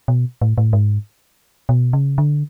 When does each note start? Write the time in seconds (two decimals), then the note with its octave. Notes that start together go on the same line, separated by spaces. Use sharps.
0.08 B2
0.42 A2
0.58 A2
0.73 G#2
1.69 B2
1.93 C#3
2.18 D3